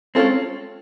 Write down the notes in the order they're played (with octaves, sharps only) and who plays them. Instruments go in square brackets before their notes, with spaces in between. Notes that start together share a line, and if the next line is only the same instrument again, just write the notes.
[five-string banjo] G#3 C#4 F4 A4 [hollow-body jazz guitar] C4